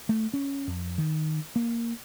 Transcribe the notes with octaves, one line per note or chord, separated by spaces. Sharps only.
A3
C#4
F2
D#3
A#3